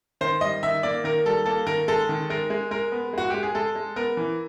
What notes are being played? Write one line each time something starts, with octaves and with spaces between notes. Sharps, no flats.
D#3 C5
G3 D#5
D#3 E5
A#3 D5
D#3 A#4
G3 A4
A#3 A4
D#3 A#4
G#3 A4
D#3
G#3 A#4
G#3
G#3 A#4
B3
G#3 F#4
G#3 G4
G#4
G#3 A4
G#3
B3 A#4
E3